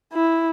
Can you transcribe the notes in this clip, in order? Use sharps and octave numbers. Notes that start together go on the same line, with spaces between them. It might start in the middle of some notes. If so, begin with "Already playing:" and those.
E4